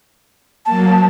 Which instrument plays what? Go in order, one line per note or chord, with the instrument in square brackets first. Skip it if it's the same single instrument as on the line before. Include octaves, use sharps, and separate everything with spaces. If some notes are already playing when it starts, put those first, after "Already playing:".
[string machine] F#3 A#3 [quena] A5